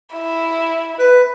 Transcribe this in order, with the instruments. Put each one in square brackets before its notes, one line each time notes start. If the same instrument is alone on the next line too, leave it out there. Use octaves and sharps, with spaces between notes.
[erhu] E4
[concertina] B4